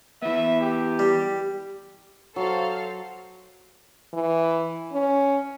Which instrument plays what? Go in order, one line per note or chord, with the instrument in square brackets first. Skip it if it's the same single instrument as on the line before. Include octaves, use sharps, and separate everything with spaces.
[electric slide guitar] E3 B3 [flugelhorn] E5
[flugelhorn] G4
[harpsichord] G3
[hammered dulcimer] F#3 [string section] A4 C5 F5
[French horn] E3
C#4